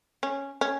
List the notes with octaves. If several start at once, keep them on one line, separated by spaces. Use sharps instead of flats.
C#4
C#4